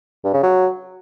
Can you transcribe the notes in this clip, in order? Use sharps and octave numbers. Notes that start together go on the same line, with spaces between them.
G2
C#3
F#3